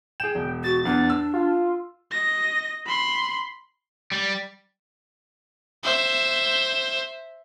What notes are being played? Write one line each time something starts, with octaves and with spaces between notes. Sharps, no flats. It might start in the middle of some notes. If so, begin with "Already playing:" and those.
G#4 G5 E7
E1
F#4 A6
E2 D4
E6
F4
D#5 A#6
B5 C6
G3
C5 E5